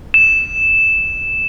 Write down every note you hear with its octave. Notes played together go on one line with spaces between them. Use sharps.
E7